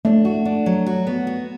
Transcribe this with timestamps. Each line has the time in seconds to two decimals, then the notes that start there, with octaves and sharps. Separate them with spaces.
0.05 A3 D4
0.25 F#4
0.45 D4
0.66 F#3
0.86 F#4
1.07 B3
1.27 F#4